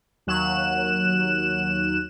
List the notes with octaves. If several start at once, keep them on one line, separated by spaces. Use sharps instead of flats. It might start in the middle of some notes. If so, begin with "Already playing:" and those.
D#2 F#3 F#6 E7